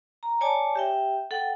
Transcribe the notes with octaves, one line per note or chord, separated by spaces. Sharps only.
A#5
C#5 D5 G#5 A5 D6
G4 E5 G5
A4 F#5 G5